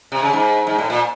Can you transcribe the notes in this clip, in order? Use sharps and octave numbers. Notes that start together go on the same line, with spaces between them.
C3
C#3
G#2
G#2
A2
A#2